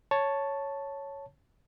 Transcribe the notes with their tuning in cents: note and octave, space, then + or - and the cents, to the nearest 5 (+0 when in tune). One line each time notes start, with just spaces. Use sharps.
C#5 +0 A5 +0